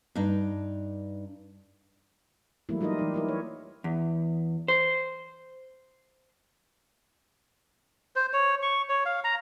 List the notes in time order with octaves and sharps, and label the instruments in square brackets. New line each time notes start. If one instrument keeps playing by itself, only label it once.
[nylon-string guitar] G2 D4 D#4
[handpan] E3 F#3 G3 A3 A#3 E4
G3 D#4 F4 A#4 D#5
E3 D#4
D#4 E4 A#4
C#5
[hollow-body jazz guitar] E2
C5
[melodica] C5
C#5
C#6
C#5
F5
A#5